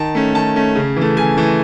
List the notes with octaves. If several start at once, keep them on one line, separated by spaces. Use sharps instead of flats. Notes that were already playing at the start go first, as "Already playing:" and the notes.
Already playing: D#3 A5
A3 C#4
D#3 A5
A3 C#4
C#3
E3 A3
C#3 G#5
E3 A3